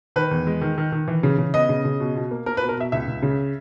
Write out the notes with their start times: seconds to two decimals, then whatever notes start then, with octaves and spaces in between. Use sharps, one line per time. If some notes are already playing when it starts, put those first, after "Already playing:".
0.16 D#3 B4
0.31 E2
0.47 G#3
0.61 D#3
0.78 D#3
0.92 D#3
1.08 E3
1.23 C#3
1.38 C#3
1.54 B3 D#5
1.69 C#3
1.85 C#3
2.00 B2
2.16 B2
2.31 A#3
2.46 A#3 A#4
2.57 B4
2.62 B2
2.69 A#4
2.77 B2 E5
2.92 C#2 E5
3.08 C#2
3.23 C#3